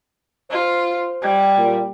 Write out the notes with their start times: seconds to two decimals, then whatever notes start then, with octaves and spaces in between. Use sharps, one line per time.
0.51 F4 C5
1.22 G3
1.58 A#2